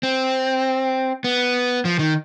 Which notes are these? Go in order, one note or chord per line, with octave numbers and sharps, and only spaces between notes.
C4
B3
F3
D#3